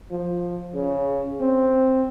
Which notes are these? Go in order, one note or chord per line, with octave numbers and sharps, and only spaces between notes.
F3
C#3
C4